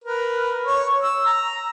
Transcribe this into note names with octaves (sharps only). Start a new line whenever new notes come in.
A#4 B4
C#5
E6
A#5